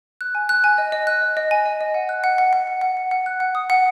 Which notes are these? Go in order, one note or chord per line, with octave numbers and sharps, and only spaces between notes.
F#6
G#5
F#6
G#5
D#5
D#5
F#6
D#5
D#5
G#5
D#5
D#5
F#5
F#6
F#5
F#5
F#5
F#5
F#5
F#5
F#5
F#6
F#5
D#6
F#5